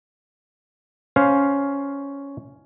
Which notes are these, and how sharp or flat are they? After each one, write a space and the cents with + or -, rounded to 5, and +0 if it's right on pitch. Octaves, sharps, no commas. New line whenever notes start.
C#4 +5 C5 +10 F5 +0